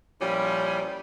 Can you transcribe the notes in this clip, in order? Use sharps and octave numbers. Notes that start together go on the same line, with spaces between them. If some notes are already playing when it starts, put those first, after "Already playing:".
A#2 F3 G3 C#4 E4